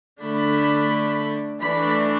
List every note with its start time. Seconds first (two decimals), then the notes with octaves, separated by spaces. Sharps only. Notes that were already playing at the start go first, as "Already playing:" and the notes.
0.22 D3 A3 D4 B5
1.62 E3 A3 D4 B5